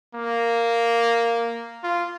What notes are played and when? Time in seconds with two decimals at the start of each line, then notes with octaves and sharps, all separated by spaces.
0.15 A#3
1.84 F4